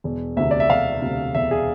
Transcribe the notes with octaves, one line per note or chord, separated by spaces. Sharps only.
E1
D2 C3 E5
D5
E5
E1 F5
D2 C3
E1 E5
G#4